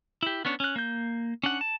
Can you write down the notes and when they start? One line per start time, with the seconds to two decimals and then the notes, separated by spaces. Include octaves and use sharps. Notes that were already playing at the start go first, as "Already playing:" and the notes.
0.23 E4 G4
0.45 B3 C#4 D4 C#5
0.60 C#4 F#6
0.76 A#3 G6
1.43 C#4 D4 F#5
1.61 A5